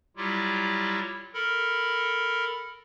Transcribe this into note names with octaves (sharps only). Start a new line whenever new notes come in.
F#3 G3 E4 F4 G4
A4 A#4 B5